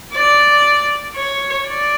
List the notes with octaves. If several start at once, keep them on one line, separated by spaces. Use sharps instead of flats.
D5
C#5
D5